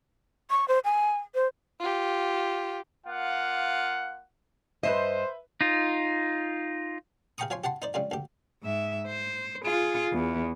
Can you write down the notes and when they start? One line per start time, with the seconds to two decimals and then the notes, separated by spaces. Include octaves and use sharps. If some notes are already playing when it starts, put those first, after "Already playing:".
0.50 C#6
0.68 C5
0.85 G#5
1.35 C5
1.80 F4 G4
3.07 A#3 F4 F#5
4.83 G2 C3 B4 C5 D#5 E5
5.61 D#4 F4
7.38 G#4 F5 G5 A#5 C#6 D#6
7.50 F3 F4 C#5 G#5 C6
7.64 G4 F#5 A5 C6
7.82 D#4 C5 D5
7.94 C#3 G3 G#3 F4
8.11 D2 G4
8.62 G#2 E5
9.07 C5
9.64 F4 G#4
10.12 E2